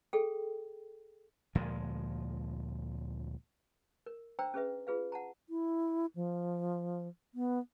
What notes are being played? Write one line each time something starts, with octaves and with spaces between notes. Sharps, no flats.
G#4 A4 G5
D2 A#2 F3 G#3
A#4
D4 C5 G5 A#5 E6
C#4 G#4 B4 E5
F4 G#4 B4 F5
F#5 A5 A#5
E4
F3
B3